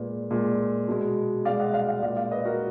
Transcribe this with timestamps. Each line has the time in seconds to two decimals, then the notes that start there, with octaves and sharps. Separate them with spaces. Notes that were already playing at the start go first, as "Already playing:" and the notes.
Already playing: A#2 G#3 B4
0.31 A#2 G#3
0.88 B2 G#3
1.45 B2 G#3 D5 F5
1.59 D#5 F#5
1.74 D5 F5
1.88 D5 F5
2.03 A#2 G#3 D5 F5
2.16 D5 F5
2.31 B4 D#5
2.45 F#4 A#4